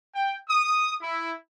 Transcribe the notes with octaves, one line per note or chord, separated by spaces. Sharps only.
G5
D#6
E4